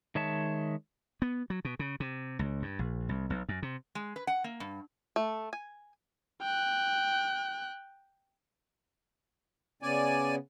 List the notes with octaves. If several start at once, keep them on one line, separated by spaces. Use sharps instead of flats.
D#3 G#3 C#5 E5 A5
B3
F#3
B2
C#3
C3
C#2
G2
A#1
C2
B1
F#2
C3
G#3
B4
F#5
A#3
G2
A3
G#5
G5 F#6
C#3 B3 C#4 D5 G#5